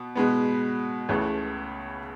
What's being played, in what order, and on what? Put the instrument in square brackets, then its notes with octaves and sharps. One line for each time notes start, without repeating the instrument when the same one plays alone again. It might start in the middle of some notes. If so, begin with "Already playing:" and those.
Already playing: [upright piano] B2 B3
B2 G#3 B3
C#2 C#3 E3 A3